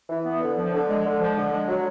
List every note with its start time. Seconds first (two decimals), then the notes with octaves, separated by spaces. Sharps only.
0.09 E3
0.25 B3
0.41 D3
0.57 F3
0.73 D3
0.88 G#3
1.05 D3
1.21 F3
1.37 D3
1.52 G#3
1.68 F#3